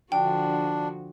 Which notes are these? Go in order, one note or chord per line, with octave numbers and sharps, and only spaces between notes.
D3 F3 D4 F#4 G5